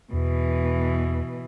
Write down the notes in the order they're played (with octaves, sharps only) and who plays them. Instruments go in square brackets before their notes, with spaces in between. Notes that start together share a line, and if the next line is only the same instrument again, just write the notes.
[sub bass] E2 [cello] B2 E3